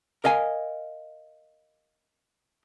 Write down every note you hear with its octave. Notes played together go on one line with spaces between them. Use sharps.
A#4 D#5 F5 G#5